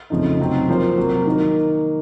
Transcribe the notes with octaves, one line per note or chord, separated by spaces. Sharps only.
F2 C#3 F3 A3 D#4
C3 F#3 C4 D#4
F3 A#3 F4 C5
C3 F#3 A#3
D#3 A#3 D#4